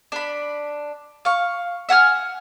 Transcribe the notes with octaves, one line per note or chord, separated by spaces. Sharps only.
D4 B5
F5 C#6
E5 F#5 G#5 F6